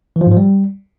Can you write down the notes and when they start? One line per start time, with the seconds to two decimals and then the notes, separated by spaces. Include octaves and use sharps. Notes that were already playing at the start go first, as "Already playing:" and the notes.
0.16 E3
0.21 F3
0.26 G#2
0.32 F3
0.37 G3